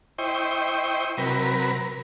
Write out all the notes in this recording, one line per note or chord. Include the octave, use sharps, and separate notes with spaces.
E4 C5 D#5 G5 C#6
C3 F#3 A#4 B4